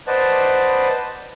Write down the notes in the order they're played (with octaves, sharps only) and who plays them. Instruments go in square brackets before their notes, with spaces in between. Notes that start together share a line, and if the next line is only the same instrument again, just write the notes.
[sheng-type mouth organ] B4 C5 D5 D#5 F#5 A5